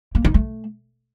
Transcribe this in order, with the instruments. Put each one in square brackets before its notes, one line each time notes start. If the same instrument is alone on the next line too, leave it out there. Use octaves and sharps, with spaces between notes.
[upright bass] A#3
D#4
A3